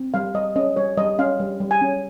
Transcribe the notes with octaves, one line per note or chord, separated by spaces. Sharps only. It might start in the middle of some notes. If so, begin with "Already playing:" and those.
Already playing: C4
G3 F5
G3 D#5
C#4 D#5
G3 C#5
G3 D#5
C#4 F5
G3
G3
G#5
C#4